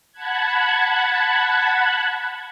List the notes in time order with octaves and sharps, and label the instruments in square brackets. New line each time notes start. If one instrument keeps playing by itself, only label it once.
[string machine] F#5 A5 B5 F#6 G#6